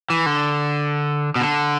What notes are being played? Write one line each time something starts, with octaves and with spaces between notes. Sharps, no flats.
E3
D3
B2
D3